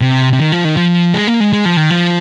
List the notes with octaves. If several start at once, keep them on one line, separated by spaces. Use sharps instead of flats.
C3
C3
D#3
F3
D#3
F3
G#3
A#3
G#3
G#3
F3
D#3
F3